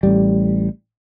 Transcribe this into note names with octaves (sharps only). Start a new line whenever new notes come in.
A1 G3